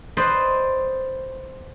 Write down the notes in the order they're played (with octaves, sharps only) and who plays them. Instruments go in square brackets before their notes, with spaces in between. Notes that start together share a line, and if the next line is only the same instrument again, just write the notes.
[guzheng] B4 C5 D5 D#5 C6